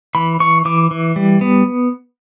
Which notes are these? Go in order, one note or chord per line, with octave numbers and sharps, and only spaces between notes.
E3 B5
E3 C#6
E3 D6
E3
G3
B3